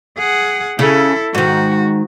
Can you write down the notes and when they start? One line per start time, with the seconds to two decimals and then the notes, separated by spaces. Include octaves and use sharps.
0.19 G#4 F#5
0.79 C#3 E4 A4
1.35 G#2 D#3 F#4